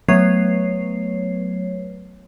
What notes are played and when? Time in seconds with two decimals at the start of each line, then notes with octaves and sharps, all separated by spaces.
0.08 F#3 A3 B3 B4 C#5 C7